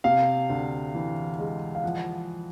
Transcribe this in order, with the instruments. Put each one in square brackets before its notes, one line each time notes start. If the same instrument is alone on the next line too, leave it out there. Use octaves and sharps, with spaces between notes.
[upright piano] C3 F5
D2
E3
G#3
F5
F3 F#5